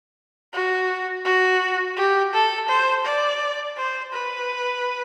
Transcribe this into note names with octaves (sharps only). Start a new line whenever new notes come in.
F#4
F#4
G4
A4
C5
D5
C5
B4